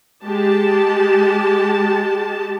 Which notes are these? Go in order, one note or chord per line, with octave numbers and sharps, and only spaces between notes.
G#3 G4 A5